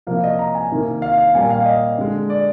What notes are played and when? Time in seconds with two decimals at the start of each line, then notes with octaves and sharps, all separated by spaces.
0.07 C3 F3 A#3 F5
0.24 D#5
0.39 A#5
0.55 G#5
0.71 C3 D#3 A#3
1.02 F5
1.18 F5
1.35 A#2 G3 A#3 G#5
1.50 F5
1.66 D#5
1.98 D3 G#3
2.30 D5